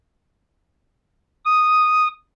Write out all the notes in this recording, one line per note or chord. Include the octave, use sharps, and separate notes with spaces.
D#6